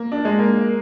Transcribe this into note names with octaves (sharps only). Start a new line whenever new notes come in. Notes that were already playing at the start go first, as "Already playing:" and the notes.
Already playing: A#3
D4
G#3
A#3